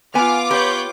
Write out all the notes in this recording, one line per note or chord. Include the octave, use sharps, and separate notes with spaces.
B3 F4 G#5 D6 F6
G4 B4 C#5 G6